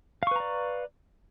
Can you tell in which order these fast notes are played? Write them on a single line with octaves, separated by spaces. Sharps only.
F5 C#6 B4 A#5 D5